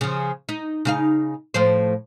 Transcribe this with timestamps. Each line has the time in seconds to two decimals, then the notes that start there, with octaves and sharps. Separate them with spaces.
0.01 C#3 F3
0.49 D#4
0.85 C#3 D#4 F5
1.54 A2 F3 C5